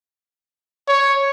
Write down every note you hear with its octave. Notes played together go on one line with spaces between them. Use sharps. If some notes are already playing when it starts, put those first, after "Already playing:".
C#5